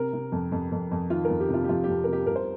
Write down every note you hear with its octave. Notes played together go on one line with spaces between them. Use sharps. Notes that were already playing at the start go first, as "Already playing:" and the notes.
Already playing: C3 A#4
C3
F2
F2
F2
F2
D#3 F4
F2 A#4
G4
C3
F4
G4
F2 F4
F2 G4
C3 A#4
G4
C2 A#4
C5